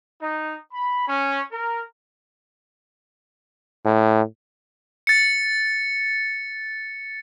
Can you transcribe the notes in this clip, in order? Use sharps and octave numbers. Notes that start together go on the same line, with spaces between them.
D#4
B5
C#4
A#4
A2
A6 C#7